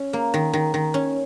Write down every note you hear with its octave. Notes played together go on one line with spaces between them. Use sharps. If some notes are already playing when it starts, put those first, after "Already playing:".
Already playing: C#4
A#3
D#3
D#3
D#3
C#4